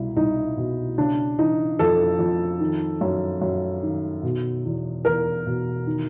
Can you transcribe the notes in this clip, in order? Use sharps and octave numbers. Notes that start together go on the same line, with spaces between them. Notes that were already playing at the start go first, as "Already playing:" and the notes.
Already playing: C2 B2 E4
C2 D#4
B2
C#3 D4
E3 D#4
F2 A4
F2
D#3
F#2
F#2
D#3
B2
E2
E2 A#4
B2
D#3